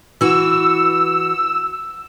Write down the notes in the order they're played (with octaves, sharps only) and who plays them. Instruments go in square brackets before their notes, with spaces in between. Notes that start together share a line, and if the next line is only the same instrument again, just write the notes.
[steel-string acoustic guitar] E3 F#4 [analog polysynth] E6